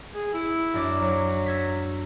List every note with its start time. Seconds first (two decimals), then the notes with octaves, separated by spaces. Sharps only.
0.15 G#4
0.34 E4
0.74 F#2 D4 D6
1.00 F#3
1.46 E6 G#6 B6